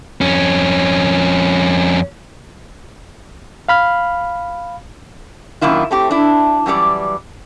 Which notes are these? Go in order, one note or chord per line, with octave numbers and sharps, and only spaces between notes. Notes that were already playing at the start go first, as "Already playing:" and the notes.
F2 C#4
F5 B5 F6
F#2 A#2 D#3 E4 F4
A3 C4 G4
D4 E4
F#2 E3 G3 D5